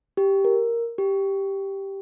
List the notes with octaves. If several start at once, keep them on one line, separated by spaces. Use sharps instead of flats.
G4
A#4
G4